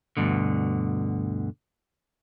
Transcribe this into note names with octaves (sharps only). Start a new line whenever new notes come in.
D2 G2 B2 D3